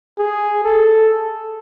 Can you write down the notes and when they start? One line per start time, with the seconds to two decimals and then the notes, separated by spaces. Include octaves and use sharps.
0.18 G#4
0.65 A4